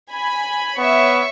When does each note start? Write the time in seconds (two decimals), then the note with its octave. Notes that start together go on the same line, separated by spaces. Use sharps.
0.12 G#5 B5
0.78 B3 C#5 E5 C#6